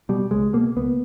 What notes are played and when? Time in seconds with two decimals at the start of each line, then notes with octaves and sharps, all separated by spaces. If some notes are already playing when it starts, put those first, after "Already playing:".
0.09 B2 G3
0.31 C#2 G#3
0.53 B2 A#3
0.76 C#2 B3